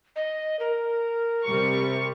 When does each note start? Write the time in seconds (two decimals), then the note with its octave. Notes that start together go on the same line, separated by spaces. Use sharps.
0.16 D#5
0.60 A#4
1.44 C3 G3 C#6